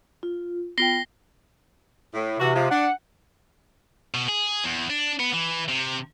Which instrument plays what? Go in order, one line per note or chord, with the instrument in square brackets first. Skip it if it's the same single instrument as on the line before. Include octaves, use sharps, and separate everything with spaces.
[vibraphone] F4
[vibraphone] B3 F4 G5 [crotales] A#6 C7 G7
[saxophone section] A2
[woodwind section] C3 [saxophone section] E3 F#4
[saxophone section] F3 G#3
[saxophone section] D4 [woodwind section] F#5
[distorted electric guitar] B2
G#4
E2
D4
B3
E3
C3